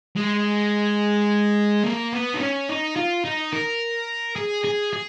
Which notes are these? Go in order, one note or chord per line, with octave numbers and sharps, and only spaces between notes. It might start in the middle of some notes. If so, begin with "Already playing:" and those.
G#3
A#3
B3
D#4
C#4
D#4
F4
D#4
A#4
G#4
G#4
G#4